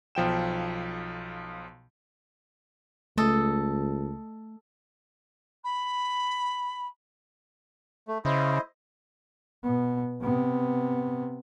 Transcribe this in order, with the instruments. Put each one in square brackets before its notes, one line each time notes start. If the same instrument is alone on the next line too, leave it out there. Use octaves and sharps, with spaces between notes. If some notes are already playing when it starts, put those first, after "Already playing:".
[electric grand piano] B1 F3 G5 E7
[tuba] C#2 [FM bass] A3 [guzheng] A4 D#5
[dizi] B5
[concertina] A3
[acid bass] C#3 [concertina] E4 C5 D#5
[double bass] B2 B3
C3 B3